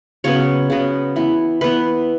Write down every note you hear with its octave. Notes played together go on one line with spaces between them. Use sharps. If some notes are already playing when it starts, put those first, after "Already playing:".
C#3 F#3 B3 C#5
C#3 F#3 B3
E3 B3
E3 B3 B4